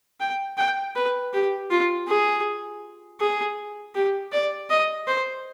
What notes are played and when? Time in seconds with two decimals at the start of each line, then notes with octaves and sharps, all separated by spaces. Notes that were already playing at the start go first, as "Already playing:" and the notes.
0.20 G5
0.57 G5
0.95 B4
1.33 G4
1.70 F4
2.08 G#4
3.20 G#4
3.95 G4
4.32 D5
4.70 D#5
5.07 C5